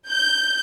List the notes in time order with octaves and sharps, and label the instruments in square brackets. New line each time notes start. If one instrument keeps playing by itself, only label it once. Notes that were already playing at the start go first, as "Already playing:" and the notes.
[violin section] G6